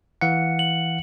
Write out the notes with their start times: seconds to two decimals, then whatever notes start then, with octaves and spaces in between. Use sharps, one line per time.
0.21 E3 F5 F#5 C#7
0.59 F#7